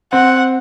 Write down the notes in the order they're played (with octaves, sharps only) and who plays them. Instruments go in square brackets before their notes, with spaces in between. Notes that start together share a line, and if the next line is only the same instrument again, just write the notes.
[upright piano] C4 [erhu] F#5